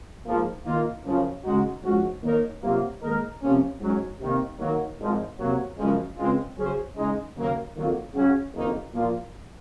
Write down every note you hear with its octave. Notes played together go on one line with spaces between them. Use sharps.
G#2 F3 A#3
D#3 A#3 F4
F#2 C#3 F3
C#3 G#3 D#4 F#4
G#2 F3 G#3 C#4 F#4
D#3 A#3 D#4 A#4 C#5
C3 F#3 A#3 F4
G#2 D#3 A#3 D#4 A#4
C3 F3 A#3 C#4
G#2 F#3 C#4
C3 D#3 A#3
D#3 F#3 A#3
G#1 G#2 F3 G#3
C3 F#3 A#3
F#2 C#3 F3 G#3
C#2 C#3 G#3 C4 F4
C#3 F#3 C#4 G#4 C5
C#3 G#3 D#4
D#2 C#3 F#3 A#3
F2 D#3 F#3 A#3 F4
C#3 F#3 C#4 F#4
F#1 F2 D#3 A#3 D#4
A#2 F3 A#3 F4